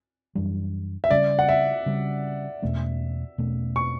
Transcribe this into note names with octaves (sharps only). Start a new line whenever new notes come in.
F#2 E3 G3 D4
E5
C#3 G3 C#4 D5
F#5
E5
C#3 G3 C#4
E2 B2 A3 C#4
E2 B2 A3 C#4
C#6